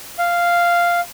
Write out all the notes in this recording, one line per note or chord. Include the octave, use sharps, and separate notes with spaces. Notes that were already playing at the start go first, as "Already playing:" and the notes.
F5